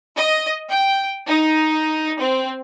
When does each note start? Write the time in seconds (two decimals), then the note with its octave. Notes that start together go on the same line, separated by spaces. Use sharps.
0.17 D#5
0.70 G5
1.27 D#4
2.19 C4